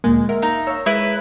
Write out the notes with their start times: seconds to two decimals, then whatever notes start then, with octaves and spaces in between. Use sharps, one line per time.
0.04 D2 A#2 G#3 A#3
0.29 A#4 E5 F#5 C6
0.42 D#4 F5
0.67 C#5 F5 C#6 E6
0.86 G#3 E4 B4